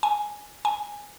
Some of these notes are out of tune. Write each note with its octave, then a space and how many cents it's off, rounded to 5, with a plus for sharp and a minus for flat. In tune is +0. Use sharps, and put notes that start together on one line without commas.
G#5 +0
G#5 -10